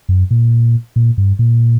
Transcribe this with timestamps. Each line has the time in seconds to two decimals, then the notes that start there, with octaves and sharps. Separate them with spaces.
0.09 F#2
0.31 A#2
0.96 A#2
1.18 G2
1.39 A#2